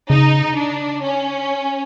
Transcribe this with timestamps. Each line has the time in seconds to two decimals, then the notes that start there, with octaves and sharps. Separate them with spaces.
0.10 C#3 D#4
0.56 D4
1.02 C#4